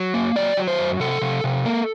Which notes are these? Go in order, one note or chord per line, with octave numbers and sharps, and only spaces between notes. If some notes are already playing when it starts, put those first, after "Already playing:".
Already playing: F#3
A#3
F#3 D5
F#3
C5
F#2
C3 A4
C3
C3
A#3